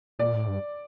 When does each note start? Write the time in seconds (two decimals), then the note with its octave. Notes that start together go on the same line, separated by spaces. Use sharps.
0.19 A#2 D5
0.34 A2
0.48 G2